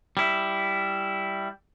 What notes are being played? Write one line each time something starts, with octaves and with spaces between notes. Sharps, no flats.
G3 E4